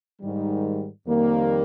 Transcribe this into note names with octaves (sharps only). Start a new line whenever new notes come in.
G#2 D#3 G3
F2 D#3 G3 A#3